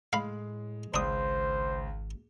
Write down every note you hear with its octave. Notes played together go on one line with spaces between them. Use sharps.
A2 G#3 F5 B5
G#1 C#2 D4 C5 D#6